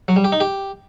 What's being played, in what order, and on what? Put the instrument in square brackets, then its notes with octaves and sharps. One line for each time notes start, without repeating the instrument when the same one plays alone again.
[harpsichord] F#3
G3
G4
D#4
G4